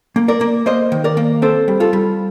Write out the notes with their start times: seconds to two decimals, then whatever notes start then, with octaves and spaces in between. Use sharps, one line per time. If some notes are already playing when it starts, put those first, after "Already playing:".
0.16 A#3
0.28 A#4 D5
0.41 A#3
0.66 A#3 C5 D#5
0.92 D#3
1.04 A#4 D5
1.17 A#3
1.42 C4 A4 C5
1.68 G3
1.80 F4 A4
1.93 G3